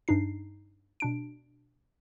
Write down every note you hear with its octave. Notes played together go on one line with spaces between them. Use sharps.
G2 D4 D#4 C7
B2 D4 D7